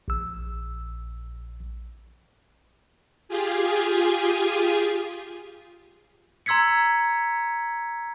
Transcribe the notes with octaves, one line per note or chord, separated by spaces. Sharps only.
A#1 E6
F4 G4 G#4 G#5
A#5 C6 E6 G#6 B6 C#7